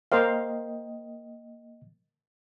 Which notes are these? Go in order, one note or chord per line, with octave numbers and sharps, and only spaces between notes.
A#3 A#4 C5 D#5 F5 G5